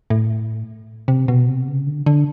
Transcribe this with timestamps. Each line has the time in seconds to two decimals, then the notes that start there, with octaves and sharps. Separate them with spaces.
0.10 A2
1.08 C3
1.28 B2
1.48 C3
1.68 C#3
1.87 D3
2.06 D3